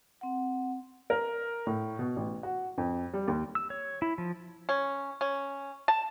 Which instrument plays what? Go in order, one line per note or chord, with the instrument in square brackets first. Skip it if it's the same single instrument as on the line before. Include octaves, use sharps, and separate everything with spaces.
[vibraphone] C4 F#5
[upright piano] A#4
A2
B2
A1
F#4
F2
G3
D#2
[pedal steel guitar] E6
C#5
E4
F3
[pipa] C#4
C#4
A5